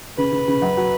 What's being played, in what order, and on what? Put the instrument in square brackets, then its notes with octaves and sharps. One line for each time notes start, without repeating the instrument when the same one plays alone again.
[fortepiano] C#3 [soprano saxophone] B4
[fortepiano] C#3
C#3
F#2
F#3